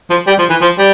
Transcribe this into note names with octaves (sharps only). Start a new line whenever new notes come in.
F3
G3
F3
E3
F3
G3